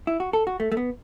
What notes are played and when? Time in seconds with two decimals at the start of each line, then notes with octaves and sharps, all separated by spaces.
0.07 E4
0.20 F#4
0.33 A4
0.47 F#4
0.60 A3
0.72 A3
0.77 B3